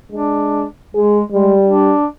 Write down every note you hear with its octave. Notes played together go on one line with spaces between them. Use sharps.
G#3 D4
G#3 G#4
G3 G#3
D4